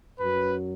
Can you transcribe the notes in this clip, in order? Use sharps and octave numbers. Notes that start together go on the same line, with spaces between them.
F#2 F#3 B4